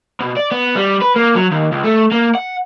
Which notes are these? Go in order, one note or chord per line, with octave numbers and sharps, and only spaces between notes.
B2
D5
B3
G3
B4
A#3
F#3
D#2
C#2
A3
A#3
F#5